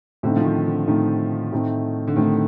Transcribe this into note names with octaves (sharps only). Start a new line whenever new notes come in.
A2 D3 A3 C4 D#4
F3
D#3
D3
A2 D#3 A3 C4 D#4
A2 A3 C4 D#4
D3
A2 D#3 A3 C4 D#4